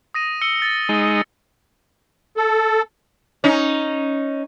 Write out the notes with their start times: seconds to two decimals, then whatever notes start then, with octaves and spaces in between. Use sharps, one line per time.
0.14 D#6 A#6 D#7
0.42 E6 C#7 G7
0.62 A6
0.89 G#3 D#4
2.37 A4
3.44 C#4 D#4